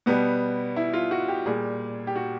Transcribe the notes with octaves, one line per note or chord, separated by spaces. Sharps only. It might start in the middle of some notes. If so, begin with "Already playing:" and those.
B2 G3 B3
E4
F4
F#4
G4
A#2 G3 G#4
G4
F#4